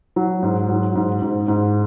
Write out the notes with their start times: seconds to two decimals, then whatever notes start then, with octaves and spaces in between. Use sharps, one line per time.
0.16 F#3
0.43 G#2
0.69 F#3
0.95 G#2
1.22 G#2
1.48 G#2